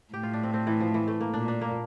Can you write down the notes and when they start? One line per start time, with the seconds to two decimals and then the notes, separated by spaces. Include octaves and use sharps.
0.13 A2 G4
0.23 F4
0.33 D4
0.43 C4
0.54 C4
0.67 E3
0.80 F3
0.94 E3
1.07 A3
1.21 A#3
1.34 A#2 D4
1.48 D4
1.61 A#3